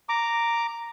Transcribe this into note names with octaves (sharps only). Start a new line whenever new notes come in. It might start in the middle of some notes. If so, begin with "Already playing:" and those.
A#5 D6